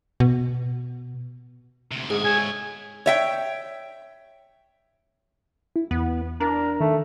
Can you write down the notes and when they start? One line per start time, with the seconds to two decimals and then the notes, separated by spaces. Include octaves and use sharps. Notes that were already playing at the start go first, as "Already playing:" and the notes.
0.20 B2
1.91 D2 C3
2.10 G#2 G#4
2.25 C#5 E5 G#5
3.06 C#5 E5 G5
5.76 E4
5.91 E2 B3
6.40 D4 A#4
6.80 D#3 A3